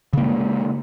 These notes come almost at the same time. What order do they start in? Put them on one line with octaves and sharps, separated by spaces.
C#3 A#3 G#3